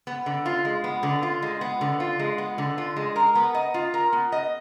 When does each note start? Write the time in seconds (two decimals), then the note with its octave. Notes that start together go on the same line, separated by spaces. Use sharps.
0.07 B3
0.26 D3
0.46 F4
0.65 G#3
0.84 B3
1.03 D3
1.23 F4
1.42 G#3
1.61 B3
1.81 D3
2.00 F4
2.19 G#3
2.38 B3
2.58 D3
2.78 F4
2.96 G#3
3.16 A#4
3.35 B3
3.55 D#5
3.74 F4
3.94 A#4
4.13 B3
4.32 D#5